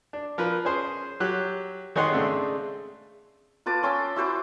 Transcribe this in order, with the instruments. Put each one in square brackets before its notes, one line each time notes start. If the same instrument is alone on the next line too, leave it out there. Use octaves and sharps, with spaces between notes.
[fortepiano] D4
F3 A#4 B4
C#4 G#4 C5
F#3 G4 F#6
D#3 G#4 C#5 D#5 F#5 C6
G#2 C#3 G#3 A3 C4 D4
[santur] F4 B4 A5 D6
C#4 C6 D6 E6
E4 F#4 C5 D6